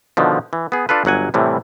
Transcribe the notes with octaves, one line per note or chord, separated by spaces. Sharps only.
B2 D3 D#3 F3
E3
B3 G#4
D4 F4 A4 B4
G1 F#3 F#5 G#5
A2 C3 E3 G3